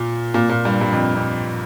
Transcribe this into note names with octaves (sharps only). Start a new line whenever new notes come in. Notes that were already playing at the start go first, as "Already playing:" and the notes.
Already playing: A#2
A#2
A#2
G2
G2
F2
F2